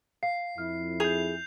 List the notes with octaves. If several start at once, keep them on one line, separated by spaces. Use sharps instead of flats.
F5 C7
F2 E4 F6
G#4 G6 F7